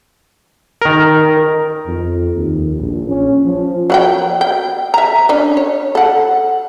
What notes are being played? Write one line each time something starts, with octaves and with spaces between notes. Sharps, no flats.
D#3 A#4
F2
D#2
A#1
C#4
F3
F#3 F#5 G5
G5
E5 A#5
C#4 D4
C#5
A4 F#5